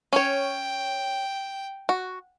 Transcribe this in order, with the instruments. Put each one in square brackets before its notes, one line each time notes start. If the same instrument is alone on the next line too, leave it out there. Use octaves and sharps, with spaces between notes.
[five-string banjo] C#4 C#5 [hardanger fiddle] G5
[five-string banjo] F#4